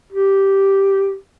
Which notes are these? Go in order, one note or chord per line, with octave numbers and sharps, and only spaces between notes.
G4